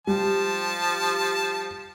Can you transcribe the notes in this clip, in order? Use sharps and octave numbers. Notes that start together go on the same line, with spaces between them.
F3 G3 A5